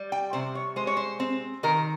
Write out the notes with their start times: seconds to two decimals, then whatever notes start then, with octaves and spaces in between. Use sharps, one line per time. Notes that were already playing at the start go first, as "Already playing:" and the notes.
Already playing: G3
0.12 G5
0.33 C3 C5
0.55 C#5
0.76 G#3 C5
0.87 C#5
0.97 C5
1.20 C4
1.63 D#3 A#4